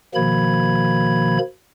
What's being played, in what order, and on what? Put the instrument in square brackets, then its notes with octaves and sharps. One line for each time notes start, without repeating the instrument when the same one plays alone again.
[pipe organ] B2 D#3 F3 A#3 B5 G#6